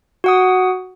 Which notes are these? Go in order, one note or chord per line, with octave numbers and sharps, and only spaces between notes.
F#4 F#5 D#6